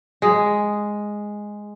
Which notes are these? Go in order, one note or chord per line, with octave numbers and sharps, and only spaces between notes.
G#3 G#4